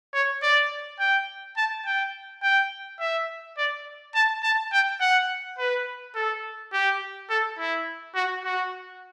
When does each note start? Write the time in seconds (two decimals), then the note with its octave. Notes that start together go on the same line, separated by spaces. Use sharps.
0.14 C#5
0.43 D5
0.99 G5
1.57 A5
1.86 G5
2.43 G5
3.00 E5
3.57 D5
4.15 A5
4.43 A5
4.72 G5
5.01 F#5
5.58 B4
6.15 A4
6.73 G4
7.30 A4
7.58 E4
8.15 F#4
8.45 F#4